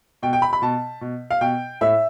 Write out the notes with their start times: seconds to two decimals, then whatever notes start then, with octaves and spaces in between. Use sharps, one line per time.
0.22 B2 G5
0.33 G5
0.42 B5
0.53 B5
0.62 B2 A5
1.01 B2
1.31 F5
1.41 B2 G5
1.81 A2 E5